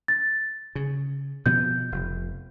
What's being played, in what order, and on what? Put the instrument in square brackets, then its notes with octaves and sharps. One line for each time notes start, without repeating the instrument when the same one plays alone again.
[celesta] A6
[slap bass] C#3
[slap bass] B2 F3 B3 [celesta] G6
[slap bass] F1